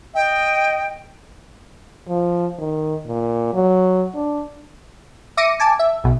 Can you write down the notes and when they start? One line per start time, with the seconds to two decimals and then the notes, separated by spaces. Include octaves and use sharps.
0.15 D#5 G5
2.09 F3
2.59 D#3
3.06 A#2
3.53 F#3
4.15 D4
5.37 E5 D6 A#6 C#7 D#7
5.60 G#5 A5 D6
5.79 E5
6.04 B1 B2